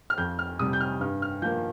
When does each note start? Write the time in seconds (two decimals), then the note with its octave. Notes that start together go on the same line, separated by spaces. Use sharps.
0.10 F6
0.18 F2 G6
0.39 F6
0.59 C3 G3 D#6
0.73 G6
0.81 F6
1.01 G2 F6
1.22 F6
1.42 F3 A#3 G6